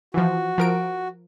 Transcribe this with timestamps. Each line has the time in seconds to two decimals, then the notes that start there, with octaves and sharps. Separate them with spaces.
0.14 E3 F3 F#4
0.58 F3 A#4 D7